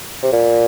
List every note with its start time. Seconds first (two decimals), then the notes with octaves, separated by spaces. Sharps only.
0.23 C3
0.32 A#2